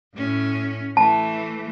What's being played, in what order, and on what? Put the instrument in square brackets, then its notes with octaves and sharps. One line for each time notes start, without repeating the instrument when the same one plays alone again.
[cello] A2 C#4
[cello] E3 A3 [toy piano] A5